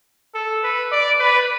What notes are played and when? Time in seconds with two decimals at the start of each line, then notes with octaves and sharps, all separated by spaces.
0.35 A4
0.63 B4
0.92 D5
1.19 B4